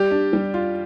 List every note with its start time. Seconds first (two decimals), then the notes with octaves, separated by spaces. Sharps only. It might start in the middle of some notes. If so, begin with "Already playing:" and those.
Already playing: G3 G4 G5
0.11 D4
0.33 G3
0.54 F4